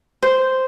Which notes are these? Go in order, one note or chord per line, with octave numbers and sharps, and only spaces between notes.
C5